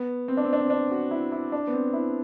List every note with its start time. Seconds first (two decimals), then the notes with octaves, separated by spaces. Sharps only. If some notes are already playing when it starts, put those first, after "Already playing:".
Already playing: B3
0.28 C4
0.37 D4
0.45 C4
0.53 D4
0.60 C4
0.70 D4
0.91 F#4
1.11 E4
1.32 E4
1.52 D4
1.67 B3
1.73 C4
1.93 E4